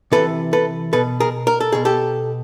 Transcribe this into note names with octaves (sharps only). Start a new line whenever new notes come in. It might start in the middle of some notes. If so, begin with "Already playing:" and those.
C3 E3 A4 B4
A4 B4
B2 A4 B4
G#4 A#4
A#4
A4
B2 G#4
G4 A4